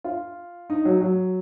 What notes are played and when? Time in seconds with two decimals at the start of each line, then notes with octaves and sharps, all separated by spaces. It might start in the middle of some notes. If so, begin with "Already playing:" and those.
0.04 F4
0.70 D#4
0.85 F#3
1.01 F#3